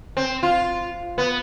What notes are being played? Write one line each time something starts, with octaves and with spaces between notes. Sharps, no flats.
C4
F4
B3